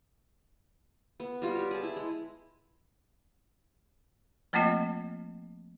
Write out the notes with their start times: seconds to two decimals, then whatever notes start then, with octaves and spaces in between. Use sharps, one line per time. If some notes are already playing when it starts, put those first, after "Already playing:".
1.20 B3
1.42 G3 F4 F#4
1.55 G4 C#5
1.71 G#4 A5
1.83 E4
1.96 G#3
4.53 F3 A3 A#3 C4 F4 D#5